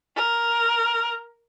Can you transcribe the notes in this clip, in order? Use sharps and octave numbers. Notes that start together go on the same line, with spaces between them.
A#4